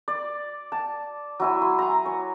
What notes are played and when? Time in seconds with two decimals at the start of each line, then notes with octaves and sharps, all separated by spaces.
0.08 D5
0.72 A5
1.40 F#3 E4 G#5
1.62 C6
1.79 G#5 A#5
2.06 C#5